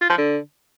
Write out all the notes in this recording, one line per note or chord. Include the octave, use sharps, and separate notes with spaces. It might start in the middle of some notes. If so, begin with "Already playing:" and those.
F4
F3
D3